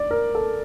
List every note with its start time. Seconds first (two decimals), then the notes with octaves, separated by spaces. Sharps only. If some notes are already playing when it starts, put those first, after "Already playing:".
Already playing: D5
0.11 A#4
0.35 A4